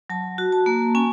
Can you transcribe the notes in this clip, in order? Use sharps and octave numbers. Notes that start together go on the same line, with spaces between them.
F#3 A5
F#4
A5
A#3
C#4 G#5